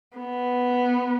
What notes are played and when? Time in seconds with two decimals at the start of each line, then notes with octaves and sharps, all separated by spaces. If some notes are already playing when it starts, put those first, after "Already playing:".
0.17 B3